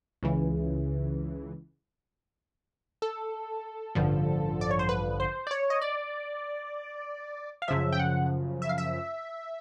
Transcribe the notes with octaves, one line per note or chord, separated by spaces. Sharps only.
C#2 C#3 E3
A4
A1 G2 D3 F3
D5
C#5
C5
B4
C5
D5
C#5
D#5
D5
F5
F#2 C#3 F3 E5
G5
F#5
E5
F5
E5